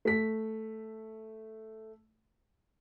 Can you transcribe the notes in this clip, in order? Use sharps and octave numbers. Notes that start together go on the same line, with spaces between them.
A3 B6